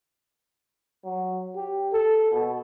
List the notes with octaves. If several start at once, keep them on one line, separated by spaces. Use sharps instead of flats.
F#3
G4
A4
B2